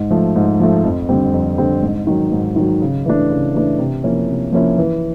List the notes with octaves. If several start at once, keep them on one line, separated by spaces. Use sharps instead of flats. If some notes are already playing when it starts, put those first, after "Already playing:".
Already playing: G#2
F3 A3
G#2
F3 A3
F2
D3 G3 C4
F2
D3 G3 C4
G#2
D#3 F#3
G#2
D#3 F#3
C#3
E3 A3 D4
C#3
E3 A3 D4
C3
F3 A#3 C#4 E4
C3
F3 A#3 C#4 E4
E3